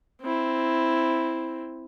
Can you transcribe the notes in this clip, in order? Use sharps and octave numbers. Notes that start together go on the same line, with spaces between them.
C4 E4